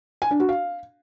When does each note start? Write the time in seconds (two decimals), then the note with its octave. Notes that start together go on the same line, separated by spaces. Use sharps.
0.22 G#5
0.31 D4
0.40 F#4
0.49 F5